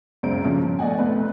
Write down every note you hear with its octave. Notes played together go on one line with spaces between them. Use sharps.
C#2 F#2 C5 D7
G2 A#2 C#3 F3 C#4
F3
A3 D5 D#5 F#5 G#5
F1 B1 A3 C4 B4